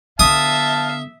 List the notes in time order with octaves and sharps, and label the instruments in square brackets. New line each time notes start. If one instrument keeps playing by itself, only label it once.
[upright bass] D3 B3 [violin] E5 [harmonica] F5 A5 [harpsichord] D#6